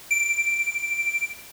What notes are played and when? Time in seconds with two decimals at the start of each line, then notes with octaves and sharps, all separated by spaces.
0.11 D7